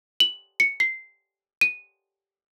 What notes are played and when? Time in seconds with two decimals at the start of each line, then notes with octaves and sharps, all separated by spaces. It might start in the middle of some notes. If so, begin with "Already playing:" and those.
0.20 F#7
0.60 C#7
0.80 C7
1.61 D#7